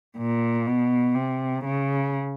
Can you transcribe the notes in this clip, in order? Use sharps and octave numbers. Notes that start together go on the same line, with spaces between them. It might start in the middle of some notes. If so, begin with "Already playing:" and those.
A#2
B2
C3
C#3